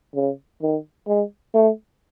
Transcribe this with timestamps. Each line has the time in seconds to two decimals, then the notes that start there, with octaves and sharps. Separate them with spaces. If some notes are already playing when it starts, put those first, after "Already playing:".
0.15 C#3
0.62 D#3
1.08 G#3
1.54 A3